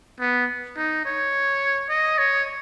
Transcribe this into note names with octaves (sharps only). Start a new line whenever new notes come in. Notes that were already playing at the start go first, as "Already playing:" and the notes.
B3
D#4
C#5
D#5
C#5